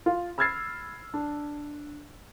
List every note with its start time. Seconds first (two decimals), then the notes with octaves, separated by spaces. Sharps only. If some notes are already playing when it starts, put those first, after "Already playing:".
0.06 F4
0.38 B5 E6 F6 G#6 A6 C7
1.14 D4